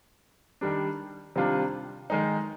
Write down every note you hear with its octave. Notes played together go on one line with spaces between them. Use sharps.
D#3 G3 D4
C3 D#3 G3 D4 F4
D#3 G#3 D#4